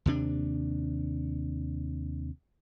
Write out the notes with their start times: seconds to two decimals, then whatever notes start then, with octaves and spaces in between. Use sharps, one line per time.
0.06 D#2 C3 D4